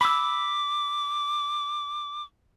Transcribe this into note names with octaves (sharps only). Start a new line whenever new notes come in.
B5 D6 E6